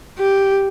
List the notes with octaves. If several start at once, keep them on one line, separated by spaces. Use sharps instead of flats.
G4